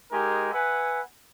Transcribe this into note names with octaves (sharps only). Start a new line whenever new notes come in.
G#3 D#4 G4 A#4 G#5
B4 E5 F#5 G#5